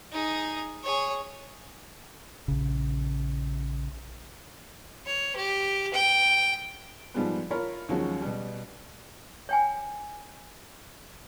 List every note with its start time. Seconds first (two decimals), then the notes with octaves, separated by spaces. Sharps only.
0.12 D#4 G#4
0.83 G#4 C#5
2.48 A#1 C#3
5.06 C#5
5.36 G4
5.94 G5
7.14 G#2 F3 G3 G#3 B3
7.51 F4 A#4 C#5 B5
7.89 D#2 F3 F#3 G#3 C#4
8.22 B2 G3
9.49 C#5 G5 G#5